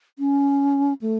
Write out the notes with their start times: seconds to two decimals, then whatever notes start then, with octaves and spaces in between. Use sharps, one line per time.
0.19 C#4
1.02 A3